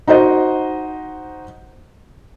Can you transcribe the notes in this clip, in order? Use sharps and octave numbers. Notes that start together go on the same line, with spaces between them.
D#4 F#4 C5 D#5